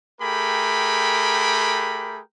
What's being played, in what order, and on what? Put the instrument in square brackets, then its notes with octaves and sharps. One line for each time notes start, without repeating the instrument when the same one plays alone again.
[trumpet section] A3 G4 G#4 A#4 G5 B5